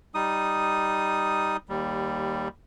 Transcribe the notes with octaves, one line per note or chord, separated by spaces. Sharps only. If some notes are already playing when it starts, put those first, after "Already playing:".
G3 D#4 D#6
D#2 G3